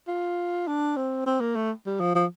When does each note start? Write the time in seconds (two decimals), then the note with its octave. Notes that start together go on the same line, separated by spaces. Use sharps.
0.08 F4
0.67 D4
0.96 C4
1.26 C4
1.40 A#3
1.55 A3
1.86 G3
2.00 F3
2.15 F3